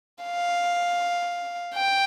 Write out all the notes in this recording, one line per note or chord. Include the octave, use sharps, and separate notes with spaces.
F5
G5